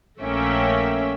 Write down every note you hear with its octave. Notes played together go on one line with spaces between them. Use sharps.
A#1 A3 A#3 C#4 E5 G5